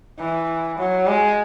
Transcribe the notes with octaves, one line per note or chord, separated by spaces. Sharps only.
E3
F#3
G#3